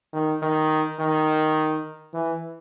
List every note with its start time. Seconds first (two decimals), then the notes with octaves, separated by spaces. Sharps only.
0.13 D#3
0.42 D#3
0.99 D#3
2.14 E3